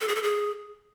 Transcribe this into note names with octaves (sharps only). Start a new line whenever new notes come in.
A4
G#4
A4
G#4